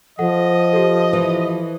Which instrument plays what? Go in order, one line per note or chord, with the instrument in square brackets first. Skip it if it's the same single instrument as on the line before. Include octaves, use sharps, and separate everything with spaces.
[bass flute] F3 [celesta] A4 F#5 [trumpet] D#5
[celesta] G4 A4
[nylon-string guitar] E3